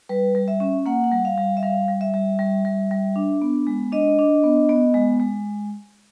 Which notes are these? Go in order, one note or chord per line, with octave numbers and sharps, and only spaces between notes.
G3 B4
G3
E5
C#4
A#3 F#5
F#5
G3
F5
G3
E5
G3 F5
G3
E5
G3
G3
G3
G3
D4
B3
G#3
D4 D#5
D4
B3
B3
G#3
G#3